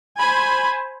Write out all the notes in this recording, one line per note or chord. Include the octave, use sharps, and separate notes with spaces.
C5 G#5 B5